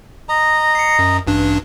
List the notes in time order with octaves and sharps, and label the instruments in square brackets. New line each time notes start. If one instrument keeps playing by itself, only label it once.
[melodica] D#5 A#5
[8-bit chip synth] C7 C#7
F#2
A1 G2 D4